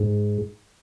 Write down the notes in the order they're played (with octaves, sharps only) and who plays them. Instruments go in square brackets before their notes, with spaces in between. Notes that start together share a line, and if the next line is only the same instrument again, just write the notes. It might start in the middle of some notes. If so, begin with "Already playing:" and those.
Already playing: [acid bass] G#2